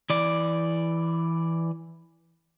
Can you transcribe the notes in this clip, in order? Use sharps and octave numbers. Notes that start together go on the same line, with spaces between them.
E3 D5